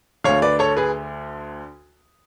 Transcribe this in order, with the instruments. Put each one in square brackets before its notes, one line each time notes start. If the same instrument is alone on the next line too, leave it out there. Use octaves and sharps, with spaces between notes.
[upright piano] D2 D3 C#5 F5
B4 D5
A4 C#5
G#4 B4